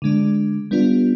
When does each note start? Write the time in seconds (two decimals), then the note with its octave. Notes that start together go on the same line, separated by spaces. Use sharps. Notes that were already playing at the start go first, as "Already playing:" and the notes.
0.02 D3 G#3 D4
0.71 G3 B3 D4 F4